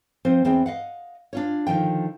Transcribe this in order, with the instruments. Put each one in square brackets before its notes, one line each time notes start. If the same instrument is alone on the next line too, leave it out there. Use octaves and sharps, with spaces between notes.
[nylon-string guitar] F3 C4 C5
E2 C4 G#4 G5
D#5 F5 F#5
D4 F4 C#5
D3 D#3 F3 G5